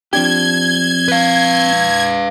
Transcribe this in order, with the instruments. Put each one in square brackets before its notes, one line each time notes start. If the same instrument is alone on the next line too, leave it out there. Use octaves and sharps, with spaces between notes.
[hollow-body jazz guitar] F3 D4 G4 [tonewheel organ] C4 [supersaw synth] G#6
[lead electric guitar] B4 F5